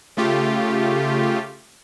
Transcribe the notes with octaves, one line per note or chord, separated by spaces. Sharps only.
C#3 A3 F4 G4